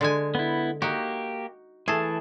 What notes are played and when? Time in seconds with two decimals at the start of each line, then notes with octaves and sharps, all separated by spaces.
0.01 D3 G#3 G#5
0.35 B3 E4
0.82 A#3 D#4 F#4 G4
1.88 E3 A3 G#4 A5